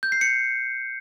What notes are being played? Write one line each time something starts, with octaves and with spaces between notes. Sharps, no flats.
G6
C7
C#7